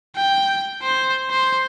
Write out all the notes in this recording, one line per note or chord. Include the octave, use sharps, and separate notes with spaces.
G5
C5
C5